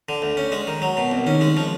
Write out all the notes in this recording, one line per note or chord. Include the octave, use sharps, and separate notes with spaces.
D3
D2
C#4
G#3
D#3
F#3
B2
C2
D#3 C#4
G#3
F3